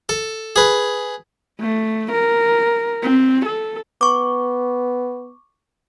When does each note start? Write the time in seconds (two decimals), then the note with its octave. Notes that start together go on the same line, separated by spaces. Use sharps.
0.09 A4
0.56 G#4 B4
1.61 A3
2.12 A#4
3.03 C4
3.46 A4
4.01 B3 C#6 D6